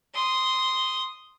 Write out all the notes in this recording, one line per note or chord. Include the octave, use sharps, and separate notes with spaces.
C6 D#6